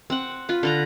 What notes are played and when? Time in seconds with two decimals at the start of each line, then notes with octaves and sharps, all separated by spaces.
0.10 C4 F#5
0.49 F4 B4
0.63 D3 B4 A#5